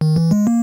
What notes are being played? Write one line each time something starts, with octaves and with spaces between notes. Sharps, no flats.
D#3
E3
G#3
A#3